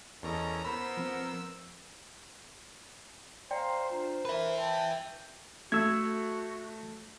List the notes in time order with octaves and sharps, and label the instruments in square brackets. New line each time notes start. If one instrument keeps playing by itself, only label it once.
[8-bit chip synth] E2 A#5 [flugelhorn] C#4 [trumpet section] A4 A#4 D#5
[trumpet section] B3 C5 [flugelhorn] A#4 [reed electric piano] B5 [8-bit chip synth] E6
[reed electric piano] F3 C4
[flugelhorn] C5 [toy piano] D5 G5 [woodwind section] F5 A#5 C6
[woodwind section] D4 F4 [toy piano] A#5
[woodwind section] A#4 [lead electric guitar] B4 E5 [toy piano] B5
[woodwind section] G5 [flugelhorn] A5
[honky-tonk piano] A3 [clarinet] F#4 [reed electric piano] E6 G#6